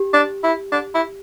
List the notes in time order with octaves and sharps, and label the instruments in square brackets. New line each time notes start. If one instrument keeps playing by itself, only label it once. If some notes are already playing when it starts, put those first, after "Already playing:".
Already playing: [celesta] G4
[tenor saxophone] D4
E4
D4
E4